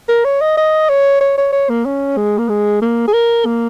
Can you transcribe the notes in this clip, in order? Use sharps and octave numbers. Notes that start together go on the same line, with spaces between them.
A#4
C#5
D#5
D#5
C#5
C#5
C#5
C#5
A#3
C#4
G#3
A#3
G#3
A#3
G#4
A#4
A#3